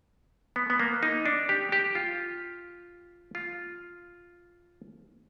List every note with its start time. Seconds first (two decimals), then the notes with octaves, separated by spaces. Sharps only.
0.56 B3
0.70 B3
0.80 A#3
1.03 D#4
1.26 D4
1.49 G4
1.72 G4
1.95 F4
3.35 F4